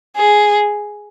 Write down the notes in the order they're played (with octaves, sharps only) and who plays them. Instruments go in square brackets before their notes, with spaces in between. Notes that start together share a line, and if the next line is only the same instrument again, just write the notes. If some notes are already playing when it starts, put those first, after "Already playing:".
[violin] G#4